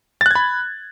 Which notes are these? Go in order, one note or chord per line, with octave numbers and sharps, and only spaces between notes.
B5 F#6 G#6 A6